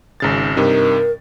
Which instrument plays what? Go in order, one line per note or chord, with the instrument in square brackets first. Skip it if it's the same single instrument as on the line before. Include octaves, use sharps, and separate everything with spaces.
[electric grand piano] G#1 C#3 A6
[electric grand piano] G2 C3 D#4 [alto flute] A#4